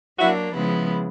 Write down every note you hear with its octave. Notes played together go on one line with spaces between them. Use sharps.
F#3 A#3 D4 E4 F#4
C#3 F3 G#3 B3 E4